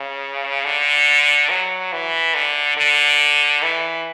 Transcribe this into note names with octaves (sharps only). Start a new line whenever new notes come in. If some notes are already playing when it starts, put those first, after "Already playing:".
Already playing: C#3
D3
F#3
E3
D3
D3
E3